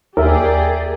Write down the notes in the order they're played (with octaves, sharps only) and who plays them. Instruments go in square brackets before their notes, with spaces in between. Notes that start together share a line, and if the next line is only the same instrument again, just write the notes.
[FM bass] D#2 [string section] G4 G#4 D5 [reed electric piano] A#4 E5